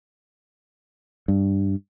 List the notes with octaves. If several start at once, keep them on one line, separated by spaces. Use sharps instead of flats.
G2